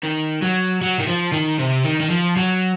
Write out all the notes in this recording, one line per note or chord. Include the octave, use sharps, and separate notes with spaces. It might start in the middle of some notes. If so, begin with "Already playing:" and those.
D#3
F#3
F#3
D#3
F3
D#3
C3
D#3
D#3
F3
F#3